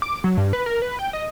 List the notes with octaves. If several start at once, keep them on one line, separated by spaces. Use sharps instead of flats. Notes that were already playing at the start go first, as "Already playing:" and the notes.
D6
F#3
G2
B4
A#4
B4
G5
D#5